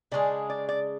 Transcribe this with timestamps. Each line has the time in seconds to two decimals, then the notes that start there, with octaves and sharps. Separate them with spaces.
0.12 C#3 G#3 D4 G#4 D5
0.50 D5
0.69 D5